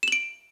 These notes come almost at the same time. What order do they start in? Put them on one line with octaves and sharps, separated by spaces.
E7 F#7 D7